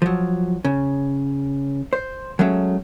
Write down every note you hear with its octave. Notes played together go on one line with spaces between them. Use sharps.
F3 F#3
C#3
C5
F#3 G#3 A3 C#4